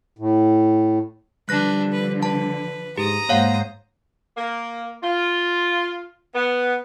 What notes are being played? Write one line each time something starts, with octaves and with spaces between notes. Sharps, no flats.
A2
D3 F3 G3 D4 B4 F#6 A#6
B4
B4 A5
G#2 G4 A#5 D#6
G#2 A#3 C5 C#5 F5 F#5
A#3
F4
B3